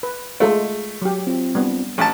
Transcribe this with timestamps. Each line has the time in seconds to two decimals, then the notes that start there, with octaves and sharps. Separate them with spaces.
0.03 B4
0.40 G#3 A3 F4
1.02 F#3 G4
1.27 C4 F4
1.55 G3 B3 D4
1.98 A1 A5